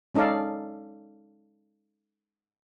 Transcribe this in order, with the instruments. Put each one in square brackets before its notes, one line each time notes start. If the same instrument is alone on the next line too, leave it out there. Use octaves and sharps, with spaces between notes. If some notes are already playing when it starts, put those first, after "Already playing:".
[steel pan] G#3 C#4 D#4 A4 D5 F5